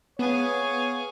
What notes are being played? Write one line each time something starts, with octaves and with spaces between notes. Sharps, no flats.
B3 G#4 C#5 F5